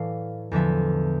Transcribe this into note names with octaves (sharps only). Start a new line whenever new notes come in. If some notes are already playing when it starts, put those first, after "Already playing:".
Already playing: A2 E3 D5 F5
E2 D3 F3 E5